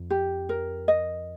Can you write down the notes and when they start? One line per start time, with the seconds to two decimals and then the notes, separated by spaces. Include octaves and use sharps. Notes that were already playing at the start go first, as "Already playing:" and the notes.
Already playing: F2
0.10 G4
0.49 A#4
0.88 D#5